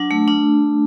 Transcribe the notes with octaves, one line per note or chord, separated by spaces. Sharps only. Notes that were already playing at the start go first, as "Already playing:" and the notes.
Already playing: F#3 D4
A3
D4